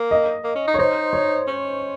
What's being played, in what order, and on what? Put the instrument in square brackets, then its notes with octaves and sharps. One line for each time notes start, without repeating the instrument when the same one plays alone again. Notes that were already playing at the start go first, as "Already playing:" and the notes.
Already playing: [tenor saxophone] A#3
[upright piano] D#5
[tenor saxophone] A#3
C#4
D#4
[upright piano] C#5
[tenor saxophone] D#4 [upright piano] C5
[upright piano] C#5
[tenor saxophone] C#4